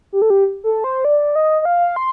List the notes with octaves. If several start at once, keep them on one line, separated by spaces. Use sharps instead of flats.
G4
A4
G4
A4
C5
D5
D#5
D#5
F5
C6